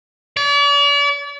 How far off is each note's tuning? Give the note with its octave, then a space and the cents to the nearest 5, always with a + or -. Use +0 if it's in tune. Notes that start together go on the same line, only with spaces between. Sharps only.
D5 -45